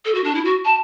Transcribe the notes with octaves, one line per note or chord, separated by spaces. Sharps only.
A4
F#4
D4
E4
F#4
A5